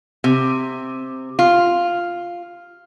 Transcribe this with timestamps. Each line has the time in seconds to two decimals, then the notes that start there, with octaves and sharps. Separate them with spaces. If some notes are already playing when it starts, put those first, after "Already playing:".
0.24 C3
1.39 F4